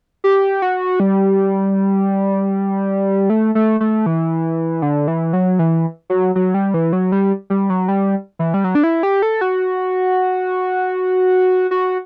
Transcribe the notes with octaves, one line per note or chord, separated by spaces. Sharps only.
G4
F#4
G3
A3
A3
A3
E3
D3
E3
F#3
E3
F#3
F#3
G3
E3
F#3
G3
G3
F#3
G3
E3
G3
F#3
D4
E4
G4
A4
F#4
F#4